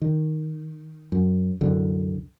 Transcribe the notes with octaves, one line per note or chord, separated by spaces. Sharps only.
D#3
F#2
C2 F#2 D3